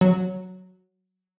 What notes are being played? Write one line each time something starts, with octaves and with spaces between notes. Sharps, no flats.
F#3